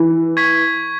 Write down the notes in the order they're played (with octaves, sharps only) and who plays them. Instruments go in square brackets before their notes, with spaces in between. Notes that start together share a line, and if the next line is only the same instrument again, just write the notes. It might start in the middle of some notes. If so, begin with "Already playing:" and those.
Already playing: [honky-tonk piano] E3
[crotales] C#6 G#6 B6